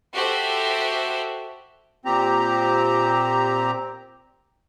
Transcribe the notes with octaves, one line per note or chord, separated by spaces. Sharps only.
F#4 G4 A4 C5 E5
A#2 C4 G4 A#5